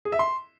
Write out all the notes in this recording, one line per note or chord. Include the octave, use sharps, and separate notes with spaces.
G#4
E5
C6